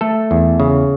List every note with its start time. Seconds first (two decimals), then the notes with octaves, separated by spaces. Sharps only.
0.01 A3 A4
0.31 E2
0.60 C#3